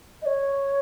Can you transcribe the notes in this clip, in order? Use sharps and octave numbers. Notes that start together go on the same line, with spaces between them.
D#5
C#5